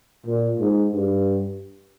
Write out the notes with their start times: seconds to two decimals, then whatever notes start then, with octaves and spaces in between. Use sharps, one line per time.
0.26 A#2
0.59 G#2
0.92 G2